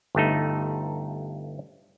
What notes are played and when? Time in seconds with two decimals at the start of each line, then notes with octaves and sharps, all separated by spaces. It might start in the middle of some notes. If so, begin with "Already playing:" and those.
0.15 G1 G2 A3 D#4